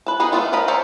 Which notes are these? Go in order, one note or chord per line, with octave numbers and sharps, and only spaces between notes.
B4 A5
B3 D#4 G#4 B4
A3 B3 D4 F4
D#3 A#4 D#5 B5
A4 A#4 C5 C#5